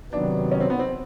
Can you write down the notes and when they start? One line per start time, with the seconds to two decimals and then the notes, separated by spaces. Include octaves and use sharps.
0.12 C3 D#3 F#3 B3 D4
0.51 C#4
0.60 C4
0.70 B3
0.79 C4